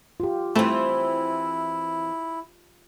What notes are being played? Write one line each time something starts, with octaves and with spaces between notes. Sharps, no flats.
F4 G4
E3 A3 C4 E4